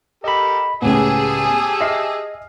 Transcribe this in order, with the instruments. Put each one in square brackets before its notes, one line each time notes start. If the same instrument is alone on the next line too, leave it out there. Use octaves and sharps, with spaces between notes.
[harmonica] G4 A4 A#4 [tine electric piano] D#5 B5
[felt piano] C#2 A2 [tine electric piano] B3 [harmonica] G4 A5 E6 [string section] G#4
[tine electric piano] D#5 [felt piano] E5 F6 C7